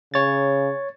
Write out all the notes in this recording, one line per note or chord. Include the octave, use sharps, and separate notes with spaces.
C#3 C#5 A6